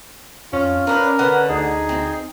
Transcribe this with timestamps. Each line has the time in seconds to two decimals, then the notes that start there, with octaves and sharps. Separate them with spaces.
0.53 F2 C#4 F4
0.87 C#4 D4 A#4 B4
1.19 D3 B4 F#5
1.49 D2 D#4 G#4
1.89 C4